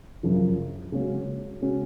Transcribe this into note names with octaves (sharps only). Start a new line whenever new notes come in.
F#2 C#3 F3
C#3 G#3 C#4 F#4
C#3 G#3 C#4 F#4